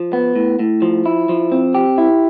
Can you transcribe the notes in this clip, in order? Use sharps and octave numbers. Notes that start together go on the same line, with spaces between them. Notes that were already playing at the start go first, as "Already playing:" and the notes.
Already playing: F3
B3
A2
A2
F3
E4
F3
C4
G4
E4